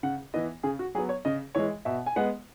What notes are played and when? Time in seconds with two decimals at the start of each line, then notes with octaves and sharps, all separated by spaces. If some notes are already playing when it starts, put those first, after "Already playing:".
0.03 C#3 F#5
0.34 E3 B3 D#5
0.63 C#3 G#4
0.79 F#4
0.95 F#3 G#4
0.98 B3
1.09 C#5
1.25 C#3 D#5
1.55 E3 G#3 C#5
1.85 B2 E5
2.06 G#5
2.16 G#3 B3 F#5